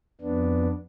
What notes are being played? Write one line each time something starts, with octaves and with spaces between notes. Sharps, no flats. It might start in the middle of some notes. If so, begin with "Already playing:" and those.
F2 B3 D4